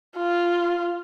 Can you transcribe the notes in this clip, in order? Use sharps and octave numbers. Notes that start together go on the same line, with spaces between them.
F4